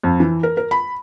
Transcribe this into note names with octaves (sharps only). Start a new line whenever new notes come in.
F2
E3
A#4
A#4
B5